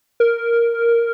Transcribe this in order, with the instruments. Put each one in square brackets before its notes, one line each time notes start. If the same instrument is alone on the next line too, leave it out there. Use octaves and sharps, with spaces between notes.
[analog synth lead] A#4